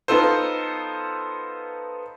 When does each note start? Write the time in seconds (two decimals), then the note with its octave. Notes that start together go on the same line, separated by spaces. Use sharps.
0.08 B3 D#4 F4 A4 C5